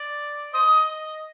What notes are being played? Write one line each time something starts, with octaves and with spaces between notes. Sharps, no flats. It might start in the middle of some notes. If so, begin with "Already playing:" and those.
Already playing: D5
C5 D#5 D#6